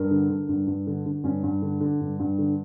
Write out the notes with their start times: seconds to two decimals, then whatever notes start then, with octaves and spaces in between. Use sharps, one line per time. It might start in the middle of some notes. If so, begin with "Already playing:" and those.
Already playing: G2 A#4
0.11 D3
0.30 D3
0.49 G2
0.67 G2
0.87 D3
1.06 D3
1.24 G2 C#4
1.43 G2
1.62 D3
1.81 D3
2.01 G2
2.19 G2
2.39 D3